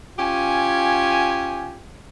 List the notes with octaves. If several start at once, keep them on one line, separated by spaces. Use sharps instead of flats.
C#4 F4 G4 G#5